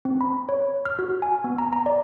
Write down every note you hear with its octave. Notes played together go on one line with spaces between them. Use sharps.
C4
B5
C#5
F6
F#4
G#5
B3
A#5
A#5
D5